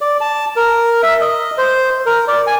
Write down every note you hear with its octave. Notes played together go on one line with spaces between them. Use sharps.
D5
A5
A#4
E5
D#5
C5
A#4
D5
G#5